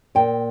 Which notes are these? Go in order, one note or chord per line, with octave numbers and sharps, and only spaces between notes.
A#2 G5